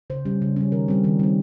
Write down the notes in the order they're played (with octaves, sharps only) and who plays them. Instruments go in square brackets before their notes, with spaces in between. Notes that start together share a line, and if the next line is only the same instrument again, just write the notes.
[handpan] C#3 C5
G3 C#4
C#3
G3 C#4
D#3 A#4
G3 C4
D#3
G3 C4